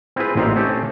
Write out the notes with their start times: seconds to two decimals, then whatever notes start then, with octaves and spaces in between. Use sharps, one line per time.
0.16 C4 E4 F4 G#4 B4
0.36 A1 A#2 C4 D#4 F5
0.55 A3 C4 C#4 G4 A4